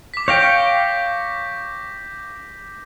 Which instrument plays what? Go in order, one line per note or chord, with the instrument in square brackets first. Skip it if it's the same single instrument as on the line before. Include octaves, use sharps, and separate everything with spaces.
[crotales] D6 B6
[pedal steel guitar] C#5 F5 G5 [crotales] G6 A#6 B6